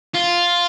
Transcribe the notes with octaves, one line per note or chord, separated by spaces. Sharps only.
F4